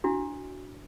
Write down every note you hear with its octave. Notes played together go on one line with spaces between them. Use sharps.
D4 E4 F#4